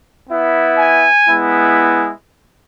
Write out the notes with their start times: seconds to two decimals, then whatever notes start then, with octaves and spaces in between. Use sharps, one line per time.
0.28 B3 E4
0.79 G#5
1.29 G#3 B3 E4